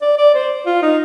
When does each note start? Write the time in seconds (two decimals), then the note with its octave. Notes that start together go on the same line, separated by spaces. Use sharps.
0.01 D5
0.17 D5
0.34 C5
0.66 F4
0.82 D#4